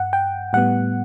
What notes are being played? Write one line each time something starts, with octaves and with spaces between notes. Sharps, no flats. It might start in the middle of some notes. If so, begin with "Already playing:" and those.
Already playing: G2 F#5
G5
A2 G3 B3 F#5